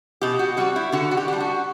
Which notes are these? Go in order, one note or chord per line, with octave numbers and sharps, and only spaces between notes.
B2 G4
F#4
G3 C4 F#4
E4
D3 F#4
F#4
G4
G3 D4
F#4